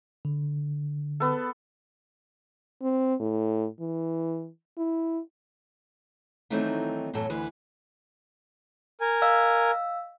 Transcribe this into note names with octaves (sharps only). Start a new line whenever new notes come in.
D3
B3 A4
C4
A2
E3
E4
D#3 E3 F#3 A3 C4 D#4
F#2 A2 E3 F#3 A4
D2 E3 B4
A#4 G#5
D#5 F5 E6